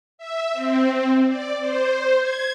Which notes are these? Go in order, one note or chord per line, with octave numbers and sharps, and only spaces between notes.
E5
C4
D5
C5
G#6